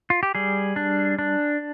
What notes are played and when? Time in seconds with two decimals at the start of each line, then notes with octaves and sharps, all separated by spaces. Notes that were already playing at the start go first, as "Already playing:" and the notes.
0.10 F4
0.23 G4
0.35 G3 G#4
0.76 D4
1.19 D4